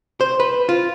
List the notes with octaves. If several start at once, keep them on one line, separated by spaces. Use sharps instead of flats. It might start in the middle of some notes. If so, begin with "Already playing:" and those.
C5
B4
F4